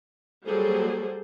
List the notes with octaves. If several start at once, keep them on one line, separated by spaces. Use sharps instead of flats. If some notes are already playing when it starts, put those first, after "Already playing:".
F#3 G3 A#3 G#4 A4 C5